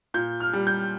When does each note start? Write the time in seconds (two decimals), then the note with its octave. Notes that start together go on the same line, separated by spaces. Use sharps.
0.14 A#2 G6
0.40 F6
0.53 G3
0.67 G6